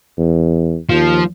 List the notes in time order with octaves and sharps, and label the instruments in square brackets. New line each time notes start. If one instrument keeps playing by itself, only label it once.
[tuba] E2
[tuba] D#2 [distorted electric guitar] F3